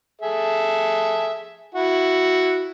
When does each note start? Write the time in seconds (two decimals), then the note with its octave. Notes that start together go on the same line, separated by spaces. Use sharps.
0.21 G#4 A4 E5
1.74 E4 F#4